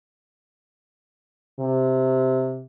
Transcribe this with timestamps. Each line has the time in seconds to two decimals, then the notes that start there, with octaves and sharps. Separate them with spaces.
1.60 C3